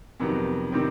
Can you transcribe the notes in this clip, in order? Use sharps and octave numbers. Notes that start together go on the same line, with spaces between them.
F2 C3 D#3 F#3 B3
C3 D#3 G3 C4